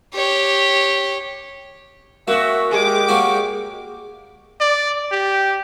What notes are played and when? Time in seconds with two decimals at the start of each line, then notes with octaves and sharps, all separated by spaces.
0.14 G4 C#5
2.28 A#3 C#4 F#4 E5
2.72 G#3 G4 G#4 D6
3.08 A#3 C#4 F#4
4.60 D5
5.12 G4